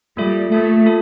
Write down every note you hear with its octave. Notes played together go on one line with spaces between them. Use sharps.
G3 A#3 F4 A4 E5
A3 A#3 F4 A4 E5
A#3 F4 A4 E5